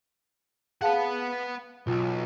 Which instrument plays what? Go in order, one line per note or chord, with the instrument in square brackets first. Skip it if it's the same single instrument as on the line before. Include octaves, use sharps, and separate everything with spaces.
[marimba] G#4 F5 A5 [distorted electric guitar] B4 F#5
[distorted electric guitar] B1 [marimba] F4